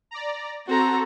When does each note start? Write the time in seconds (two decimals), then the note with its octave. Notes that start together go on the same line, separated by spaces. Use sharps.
0.11 D5 A#5
0.67 C4 F#4 A4 A#5